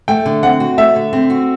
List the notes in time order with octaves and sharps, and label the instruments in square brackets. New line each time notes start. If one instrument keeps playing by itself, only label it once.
[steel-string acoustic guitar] A3 [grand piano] G5
[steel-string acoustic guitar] D3
[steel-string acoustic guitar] C4 [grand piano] F#5
[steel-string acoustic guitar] F#4
[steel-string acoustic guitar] A3 [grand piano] E5
[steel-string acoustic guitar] D3
C4
F#4